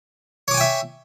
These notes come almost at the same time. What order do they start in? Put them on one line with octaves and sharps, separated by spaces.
C#5 D6 G#5 G5 E5